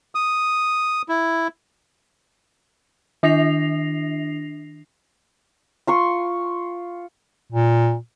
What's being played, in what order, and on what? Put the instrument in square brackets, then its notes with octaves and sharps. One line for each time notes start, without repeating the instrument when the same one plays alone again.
[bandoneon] D#6
E4
[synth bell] D#3 D4 A#6 C7 F7
[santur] F4 C6 C#6
[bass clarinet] A#2